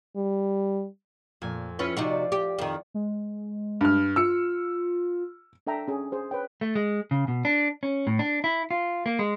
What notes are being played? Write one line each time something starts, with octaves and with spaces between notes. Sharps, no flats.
G3
F2 A#2 G#5
C#4 E4 F4 B4
C3 D#4 F4 F#4 C5 D5
G4
F2 D#3
G#3
G2 F6
F4 E6 C#7
D4 A4 E5 G5 A#5
C#4 G#4
G#4 C5
B4 C#5 G5
A3
G#3
C#3
B2
D4
C#4
A2
D4
E4
F4
A#3
G#3